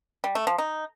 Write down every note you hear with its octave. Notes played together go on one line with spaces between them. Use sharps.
G3
A3
F3
D#4